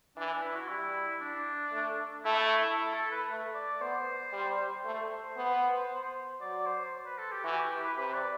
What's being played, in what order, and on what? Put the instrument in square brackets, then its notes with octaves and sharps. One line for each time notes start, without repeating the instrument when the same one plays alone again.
[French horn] E3 [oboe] D4
[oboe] D4
E4
F#4
[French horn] G3 [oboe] E4
[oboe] D4
[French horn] A3
[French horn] A3 [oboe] E4
[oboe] E4
A4
B4
[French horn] A3
[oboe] D5
[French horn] B3 [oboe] C5
[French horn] G3
[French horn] A3 [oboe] C5
[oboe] C5
[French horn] B3
[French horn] F#3 [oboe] D5
[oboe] C5
B4
A4
G4
[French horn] E3 [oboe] F#4
[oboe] G4
G4
B4
[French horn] C3 [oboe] B4
[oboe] D5